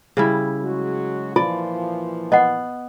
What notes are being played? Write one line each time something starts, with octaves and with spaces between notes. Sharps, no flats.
C#3 G3 E4
F#3 G#3 F#4
A#2 E3 F3 F4 D5
B3 D#5 F#5